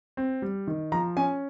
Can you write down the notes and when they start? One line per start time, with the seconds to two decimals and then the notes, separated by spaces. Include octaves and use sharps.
0.17 C4
0.42 G3
0.67 D#3
0.92 F3 A#5
1.17 C#4 G#5